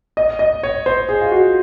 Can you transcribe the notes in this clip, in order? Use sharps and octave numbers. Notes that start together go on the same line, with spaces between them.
D#5
D#5
C#5
C5
G#4
F4
F#4